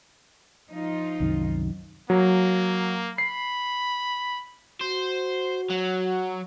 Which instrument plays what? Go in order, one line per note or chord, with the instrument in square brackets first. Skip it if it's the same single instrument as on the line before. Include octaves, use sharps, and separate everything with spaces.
[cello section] F3 D#4 F4
[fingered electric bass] C2 F#2 D#3
[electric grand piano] F#3 [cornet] A#3
[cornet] B5 [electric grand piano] C7
[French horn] F#4 [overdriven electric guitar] C5
[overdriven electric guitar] F#3